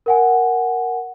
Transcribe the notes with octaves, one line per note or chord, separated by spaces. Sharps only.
A#4 F#5 G#5